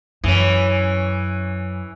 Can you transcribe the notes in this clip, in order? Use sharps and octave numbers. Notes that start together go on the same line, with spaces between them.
F#2 E3 C#4